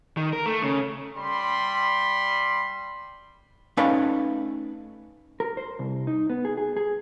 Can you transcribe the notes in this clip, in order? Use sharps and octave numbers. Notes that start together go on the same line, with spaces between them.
D#3
A#4
A3
C#3
G3 B5 C6
A3 C#4 D#4 B4 D5 F5
A#4
C5
C2
D#4
B3
G#4
G#4
G#4